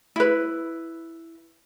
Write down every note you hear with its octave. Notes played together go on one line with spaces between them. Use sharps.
E4 B4